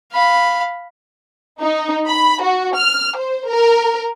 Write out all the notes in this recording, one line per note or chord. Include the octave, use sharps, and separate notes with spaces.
F5 B5
D#4
B5
F#4
F6
C5
A#4